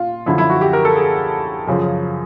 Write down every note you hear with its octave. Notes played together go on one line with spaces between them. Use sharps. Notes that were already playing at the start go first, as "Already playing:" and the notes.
Already playing: A#2 F4
F#2 D3 F3 E4
E4
F#4
G4
A#4
A4
G#4
F#2 C#3 F3